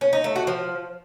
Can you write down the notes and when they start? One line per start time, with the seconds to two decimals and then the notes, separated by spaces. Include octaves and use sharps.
0.01 C#4
0.13 D#4
0.24 A3
0.36 F#4
0.47 F3